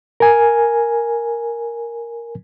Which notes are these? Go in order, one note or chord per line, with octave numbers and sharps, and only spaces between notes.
A#4 G#5